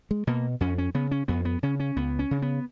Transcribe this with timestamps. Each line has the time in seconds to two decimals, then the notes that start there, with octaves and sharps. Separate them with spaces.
0.11 G#3
0.27 B2 A#3
0.60 F2 C#4
0.78 C#4
0.94 C#3 B3
1.11 C#4
1.28 F2 B3
1.45 B3
1.63 C#3 C#4
1.80 C#4
1.97 C#2 B3
2.19 C#4
2.31 C#3
2.42 B3